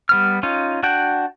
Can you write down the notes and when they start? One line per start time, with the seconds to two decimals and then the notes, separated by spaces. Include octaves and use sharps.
0.09 G3 B3 F6
0.43 C#4 D#4 F4
0.83 D4 F#4 F#5 G5